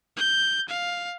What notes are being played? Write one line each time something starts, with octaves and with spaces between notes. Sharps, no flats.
G6
F5